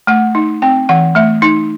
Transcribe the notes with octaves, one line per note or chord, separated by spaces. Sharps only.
A3 F#5
D#4
C4 G5
E3 F#5
A3 E5
D#4